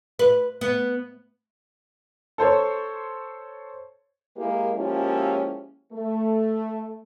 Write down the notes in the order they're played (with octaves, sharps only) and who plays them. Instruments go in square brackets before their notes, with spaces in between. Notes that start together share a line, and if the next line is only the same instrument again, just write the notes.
[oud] B4
B3
[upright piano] A4 C5 C#5 C#6
[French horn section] G#3 A#3 E4 G4 A#4
F3 G#3 A#3 C#4 E4 G4
A3